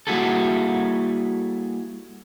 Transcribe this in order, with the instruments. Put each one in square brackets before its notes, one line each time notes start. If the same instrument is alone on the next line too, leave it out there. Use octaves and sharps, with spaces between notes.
[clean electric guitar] G3 A#3 E4 F#4 G#4 A4